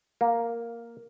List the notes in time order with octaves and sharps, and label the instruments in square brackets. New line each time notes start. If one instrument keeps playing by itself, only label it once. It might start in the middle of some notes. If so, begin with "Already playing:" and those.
[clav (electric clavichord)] A#3